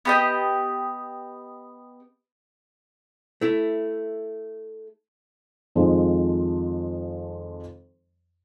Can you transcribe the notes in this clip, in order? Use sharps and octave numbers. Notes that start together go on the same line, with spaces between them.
B3 G4 D#5
A3 E4
F2 D#3 F3 G#3